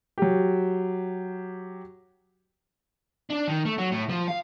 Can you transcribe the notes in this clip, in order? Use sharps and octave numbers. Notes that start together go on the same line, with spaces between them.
F#3 G4
D4
D#3
A3
F#3
A2
F3
F5